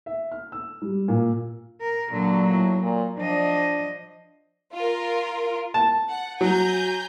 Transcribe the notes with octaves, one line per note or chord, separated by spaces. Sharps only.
E5
F6
E6
G3
A#2
A#4
A#2 D3 F#3
A2
A#2
F3 D4 D#5
F4 A#4
A5
F#5
F#3 G#5 A#5 G6